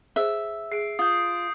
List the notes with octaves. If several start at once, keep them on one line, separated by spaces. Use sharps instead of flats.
G#4 C5 E5
G#4 C7 D7
F4 D#6 G6